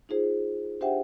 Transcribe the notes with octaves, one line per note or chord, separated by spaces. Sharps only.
D#4 F4 G#4 C5
D4 G4 C5 E5 F#5 G5